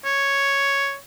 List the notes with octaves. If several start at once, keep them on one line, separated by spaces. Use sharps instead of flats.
C#5